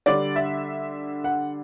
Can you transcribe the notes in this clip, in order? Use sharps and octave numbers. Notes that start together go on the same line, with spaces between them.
D3 G3 D4 D5
E5
F#5